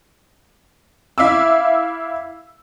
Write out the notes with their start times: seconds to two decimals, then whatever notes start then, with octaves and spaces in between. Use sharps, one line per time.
1.18 E4 E5 F5 D6 E6